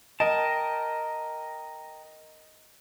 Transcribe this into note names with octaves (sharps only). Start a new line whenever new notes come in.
A#4 D#5 G5 A5